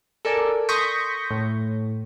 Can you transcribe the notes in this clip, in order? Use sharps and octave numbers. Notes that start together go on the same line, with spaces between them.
A4 A#4 D5 G#5
C6 C#6 D#6 G6 A#6 B6
A2